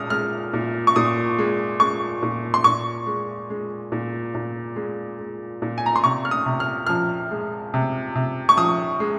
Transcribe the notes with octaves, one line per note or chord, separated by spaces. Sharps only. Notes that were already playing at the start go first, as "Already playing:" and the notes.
Already playing: A#2 G#3 D#6 F6
G#3 F6
A#2
C#6
A#2 D#6
G#3
G#3 C#6
A#2
C6
A#2 C#6
G#3
G#3
A#2
A#2
G#3
G#3
A#2
G#5
A#5
C6
C3 C#6
F6
D#6
C3
F6
F3 F6
G#3
C3
C3
C#6
F3 D#6
G#3